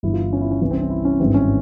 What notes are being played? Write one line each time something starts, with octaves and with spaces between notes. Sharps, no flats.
G1 G2 E3 E4
F4
E4
C#4
E4
C#4
C2 C3 E3 C#4
C4
C#4
E4
C#4
G#1 G2 E3 C4
C#4